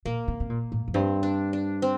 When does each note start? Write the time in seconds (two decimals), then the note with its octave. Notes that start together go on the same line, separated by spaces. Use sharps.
0.05 A#2 A#3
0.28 C3
0.40 C3
0.50 A#2
0.72 A2
0.88 F2
0.94 G2 C4
1.23 D4
1.53 D4
1.82 C4